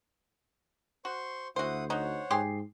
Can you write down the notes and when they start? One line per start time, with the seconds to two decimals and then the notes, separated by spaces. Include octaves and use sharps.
1.05 F#4 C5 C6 C#6
1.56 D2 E4 F#4 C5 F#5 D#6
1.90 D#4 F#4 C5 C#5 F#5
2.31 G#2 G4 G#4 C6